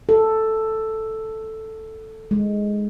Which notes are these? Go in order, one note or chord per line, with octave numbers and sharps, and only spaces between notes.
A4
G#3